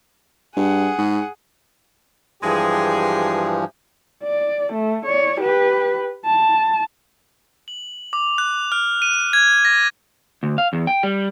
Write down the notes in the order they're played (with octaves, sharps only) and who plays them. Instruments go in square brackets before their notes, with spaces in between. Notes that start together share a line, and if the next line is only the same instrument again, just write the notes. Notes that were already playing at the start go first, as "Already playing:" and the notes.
[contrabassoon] G2 [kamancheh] G#4 F#5
[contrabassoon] G#2
[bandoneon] G2 E3 F3 [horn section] G#3 G4 G#4
[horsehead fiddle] D5
A3
C#5 D5
G4 B4
A5
[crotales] F#7
D6
F#6
F6
D#7
G#6
A#6
[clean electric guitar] D2
F5
E2
G5
G3